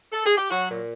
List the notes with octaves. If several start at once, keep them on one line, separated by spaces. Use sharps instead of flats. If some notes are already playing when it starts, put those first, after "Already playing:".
A4
G#4
G4
F#3 F#4
A#2